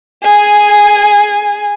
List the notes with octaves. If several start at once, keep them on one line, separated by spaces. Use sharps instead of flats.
G#4 G#5